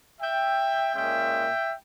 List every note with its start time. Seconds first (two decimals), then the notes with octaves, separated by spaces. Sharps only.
0.20 E5 G5
0.94 A#2 G#3 C#4 E5 G5